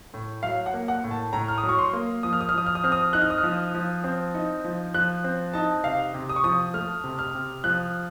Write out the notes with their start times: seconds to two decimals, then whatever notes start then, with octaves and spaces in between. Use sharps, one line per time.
0.14 A2
0.43 F#3 F5
0.66 F#5
0.74 A#3
0.88 F#5
1.04 A2
1.11 A5
1.33 A2 A#5
1.48 F6
1.58 D#6
1.64 F#3
1.69 C#6
1.79 C6
1.93 A#3
2.23 F3 D#6
2.33 F6
2.41 D#6
2.49 F6
2.54 F3 D#6
2.66 F6
2.75 D#6
2.84 C4 F6
2.92 D#6
3.13 D#4 F#6
3.22 F6
3.30 D#6
3.38 F6
3.43 F3
3.74 F3
4.04 C4
4.34 D#4
4.64 F3
4.94 F3 F#6
5.24 C4
5.53 D#4 A5
5.84 C3 F5
6.14 C3
6.29 D#6
6.36 C#6
6.44 F3 D#6
6.74 A3 F6
7.04 C3
7.19 F6
7.35 C3
7.64 F3 F#6